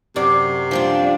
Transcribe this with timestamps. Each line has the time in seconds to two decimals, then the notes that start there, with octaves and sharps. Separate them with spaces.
0.16 F#2 C3 F#4 D5
0.71 F3 G3 D4 F4